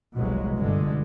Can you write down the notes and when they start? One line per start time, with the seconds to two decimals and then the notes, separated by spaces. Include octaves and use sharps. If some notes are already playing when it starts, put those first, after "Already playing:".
0.15 F1 C2 B2 F#3 G#3
0.58 G1 G2 D3 G#3